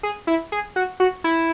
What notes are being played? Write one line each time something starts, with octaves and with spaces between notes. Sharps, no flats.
G#4
E4
G#4
F#4
F#4
E4